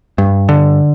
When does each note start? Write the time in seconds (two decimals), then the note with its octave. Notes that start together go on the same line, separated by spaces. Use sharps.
0.18 G2
0.49 D3